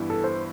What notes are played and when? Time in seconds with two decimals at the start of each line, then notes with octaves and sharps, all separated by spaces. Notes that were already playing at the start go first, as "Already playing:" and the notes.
Already playing: G2 E3 B3 E4
0.10 A4
0.24 C5